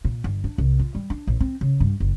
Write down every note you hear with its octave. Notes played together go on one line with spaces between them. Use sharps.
A#2
G1
D4
C2
F4
G3
D4
A#1
C4
C#3
G2
F#1